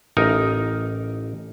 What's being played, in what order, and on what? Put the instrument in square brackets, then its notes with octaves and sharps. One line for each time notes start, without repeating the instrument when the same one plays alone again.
[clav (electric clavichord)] A1 D#4 A#4